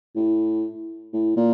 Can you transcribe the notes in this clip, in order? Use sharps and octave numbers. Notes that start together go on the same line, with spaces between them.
A2
A2
A#2